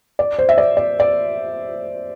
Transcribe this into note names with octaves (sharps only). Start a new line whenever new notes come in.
D5
C5
E5
D5
D5
D5